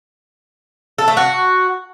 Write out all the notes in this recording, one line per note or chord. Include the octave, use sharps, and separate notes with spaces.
A4
A3
F#4